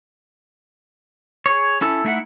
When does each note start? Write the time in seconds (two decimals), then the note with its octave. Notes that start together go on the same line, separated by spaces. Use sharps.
1.46 G#4 C#5
1.81 C#4 E4 A4
2.05 A3 D#4 E4 E5 F#5